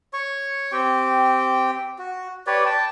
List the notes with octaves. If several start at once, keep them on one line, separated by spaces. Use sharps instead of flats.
C#5 C#6
C4 G4 G5
F#4
G4 B4 C#5 D5
G5 A5